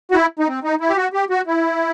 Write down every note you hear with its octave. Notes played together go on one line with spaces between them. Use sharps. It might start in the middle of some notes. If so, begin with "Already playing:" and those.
F#4
E4
D#4
C4
D#4
E4
G4
F#4
G4
F#4
E4